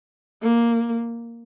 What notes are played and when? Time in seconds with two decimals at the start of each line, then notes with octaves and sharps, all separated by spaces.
0.42 A#3